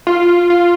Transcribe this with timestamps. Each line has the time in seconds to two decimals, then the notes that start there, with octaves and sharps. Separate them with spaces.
0.07 F4
0.50 F4